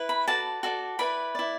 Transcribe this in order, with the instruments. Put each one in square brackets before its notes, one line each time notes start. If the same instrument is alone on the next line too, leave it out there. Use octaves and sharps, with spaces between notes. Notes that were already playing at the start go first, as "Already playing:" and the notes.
Already playing: [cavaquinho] E4 B4
B5
F#4 A4 D5 A5
F#4 A4 D5
E4 B4 D5 B5
E4 D5